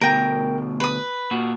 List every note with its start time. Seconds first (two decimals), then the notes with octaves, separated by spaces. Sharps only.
0.01 D2 B2 A#4 G5
0.80 B4 D#6
1.31 A#2 F#4